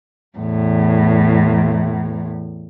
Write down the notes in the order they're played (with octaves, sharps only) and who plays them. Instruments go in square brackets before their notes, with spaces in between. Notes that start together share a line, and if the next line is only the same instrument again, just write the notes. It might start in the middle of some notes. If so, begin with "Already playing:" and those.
[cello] E2 A2